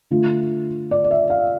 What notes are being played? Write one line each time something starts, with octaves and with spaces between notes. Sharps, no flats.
D3 A3 F4
D5
D5
E5
F5